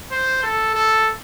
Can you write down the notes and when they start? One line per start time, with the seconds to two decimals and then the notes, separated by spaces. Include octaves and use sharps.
0.11 C5
0.43 A4
0.75 A4